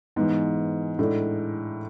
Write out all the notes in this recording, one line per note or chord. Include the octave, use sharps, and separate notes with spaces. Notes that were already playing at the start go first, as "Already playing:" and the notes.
G#2 E3 G#3 B3
A2 G#3 D4 A4